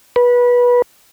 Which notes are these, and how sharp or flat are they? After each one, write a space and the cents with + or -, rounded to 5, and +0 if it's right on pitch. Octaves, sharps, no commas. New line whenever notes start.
B4 -20